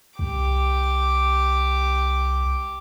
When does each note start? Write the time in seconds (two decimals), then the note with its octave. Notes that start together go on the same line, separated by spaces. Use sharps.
0.19 C2 G4 D6